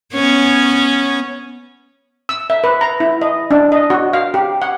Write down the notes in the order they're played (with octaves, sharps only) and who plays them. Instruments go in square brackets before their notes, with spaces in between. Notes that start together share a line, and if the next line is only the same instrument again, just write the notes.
[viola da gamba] B3 C#4 C#5
[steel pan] E6
E5
B4
A#5
E4
D#5
D4
D#5
F#4
F5
G4
F#5